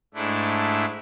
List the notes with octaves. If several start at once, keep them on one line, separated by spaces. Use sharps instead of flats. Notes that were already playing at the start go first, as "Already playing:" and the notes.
G#2 A3 D4 E4